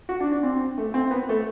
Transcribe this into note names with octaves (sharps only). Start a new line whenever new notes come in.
F#4
D4
D4
C4
A3
C4
B3
A3